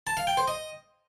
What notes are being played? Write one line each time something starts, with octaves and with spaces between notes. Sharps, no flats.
A5
F5
G5
C5
D#5